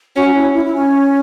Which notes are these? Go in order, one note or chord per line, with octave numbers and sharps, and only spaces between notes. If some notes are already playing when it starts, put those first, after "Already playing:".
C#4 F#4
F#4
E4
E4
E4
C#4